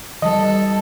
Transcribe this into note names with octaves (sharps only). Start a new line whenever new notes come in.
E3 G3 A4 D#5